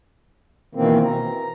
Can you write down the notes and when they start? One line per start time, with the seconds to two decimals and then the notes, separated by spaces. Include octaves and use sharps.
0.75 B2 D#3 E3 A#3 C4
1.05 A#5